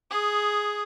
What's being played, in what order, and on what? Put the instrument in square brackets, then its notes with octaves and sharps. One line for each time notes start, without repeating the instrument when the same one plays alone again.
[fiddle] G#4 D#6